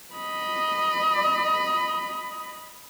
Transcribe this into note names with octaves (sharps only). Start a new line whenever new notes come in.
D#5 B5